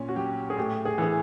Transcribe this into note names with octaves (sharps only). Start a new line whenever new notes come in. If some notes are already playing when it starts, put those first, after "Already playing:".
Already playing: A#2 C#4
F#4
F#3 G4
G#4
A2 G4
G#4
E3 G#4